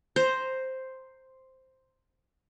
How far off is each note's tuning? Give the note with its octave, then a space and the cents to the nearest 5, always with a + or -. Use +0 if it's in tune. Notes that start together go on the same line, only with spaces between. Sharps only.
C5 +0 A#5 +0